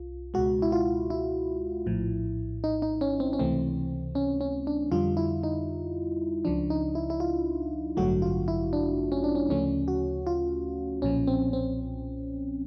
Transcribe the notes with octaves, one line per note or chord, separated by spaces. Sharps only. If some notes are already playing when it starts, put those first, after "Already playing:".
Already playing: C2 F4
C#2 B2 G#3 F#4
E4
F4
E4
A#1 A2 F3
D#4
D#4
C#4
C4
C#4
C#2 C3 E3 A3 C4
C#4
C#4
D4
F2 D3 G3 F4
E4
D#4
C#2 C#3 F3 D4
D#4
E4
E4
F4
A1 G2 D3 F#3 A3 F#4
F4
E4
D4
C#4
D4
C#4
D2 C#3 F3 A3 C#4
F#4
F4
B1 A#2 F3 C#4
C4
C4